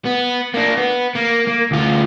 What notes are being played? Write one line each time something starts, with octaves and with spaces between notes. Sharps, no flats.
B3
A#3 D4
B3
A#3
A#3
D2 F4